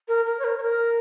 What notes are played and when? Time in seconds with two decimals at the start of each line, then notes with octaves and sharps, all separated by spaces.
0.08 A#4
0.26 A#4
0.39 C#5
0.44 A#4
0.58 C#5
0.62 A#4